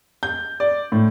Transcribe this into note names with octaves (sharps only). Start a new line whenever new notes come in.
G6
D5
A2